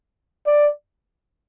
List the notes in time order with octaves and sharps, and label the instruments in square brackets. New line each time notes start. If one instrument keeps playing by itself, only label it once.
[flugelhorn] D5